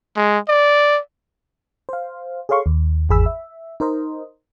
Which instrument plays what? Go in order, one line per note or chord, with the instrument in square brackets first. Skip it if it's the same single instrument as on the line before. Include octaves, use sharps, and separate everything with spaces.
[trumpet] G#3
D5
[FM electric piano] C5 F5
G#4 A4 C#5 F5 C6 C#6
D#2
G#1 E2 G#4 B5 E6
E5
D#4 A#4 C5 D#5